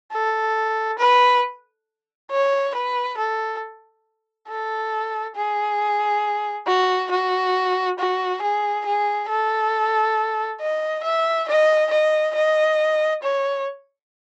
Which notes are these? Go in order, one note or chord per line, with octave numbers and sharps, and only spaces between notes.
A4
B4
C#5
B4
A4
A4
G#4
F#4
F#4
F#4
G#4
G#4
A4
D#5
E5
D#5
D#5
D#5
C#5